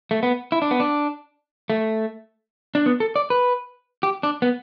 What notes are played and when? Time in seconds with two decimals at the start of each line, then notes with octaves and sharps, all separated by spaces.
0.11 A3
0.23 B3
0.52 E4
0.62 D4
0.71 B3
0.80 D4
1.70 A3
2.75 D4
2.86 B3
3.00 A4
3.16 D5
3.30 B4
4.03 G4
4.23 D4
4.42 B3